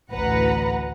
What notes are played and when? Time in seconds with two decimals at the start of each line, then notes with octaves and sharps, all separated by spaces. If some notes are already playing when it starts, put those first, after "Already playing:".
0.12 A1 D2 A2 B4 F#5 A#5